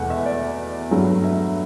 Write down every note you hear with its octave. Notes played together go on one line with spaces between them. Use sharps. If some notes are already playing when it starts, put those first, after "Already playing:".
Already playing: E2 B2 A3 F#5
E5
D5
G2 F#3 A3
E5